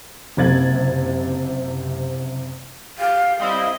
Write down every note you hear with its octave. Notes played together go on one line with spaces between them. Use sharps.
F#1 C3 G#6 A6 F#7
G4 F5
G3 C4 E4 D#5